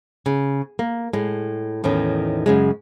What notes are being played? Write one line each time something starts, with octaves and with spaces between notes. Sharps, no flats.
C#3
A#3
A2 G#3
E2 A2 D#3 C#4
F#2 C#3 G#3